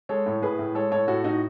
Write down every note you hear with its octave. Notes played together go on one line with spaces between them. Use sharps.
G#3 A4 C#5
A2
A2 G#4 B4
A2
G#3 A4 C#5
A2 A4 C#5
A2 F#4 A4
A2 D#4 F#4